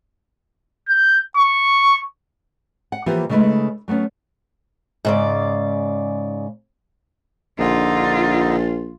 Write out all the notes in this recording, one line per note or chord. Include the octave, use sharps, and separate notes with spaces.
G6
C#6
F#5
E3 F3 A#3 B3 F4 G4
C#3 G#3 A3 D#4 B4
F#3 A3 B3 C#4
G#2 C#3 D5
A#1 D3 D#4 F4